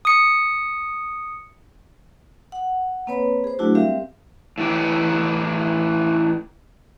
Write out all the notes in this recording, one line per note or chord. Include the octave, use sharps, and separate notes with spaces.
D#6 C#7
F#5
A#3 C4 B4 C#5 B5
G#4 C5
F#3 A3 D4 E4 F#4
G3 C4 G4 A#4 E5 F5
A2 E3 G4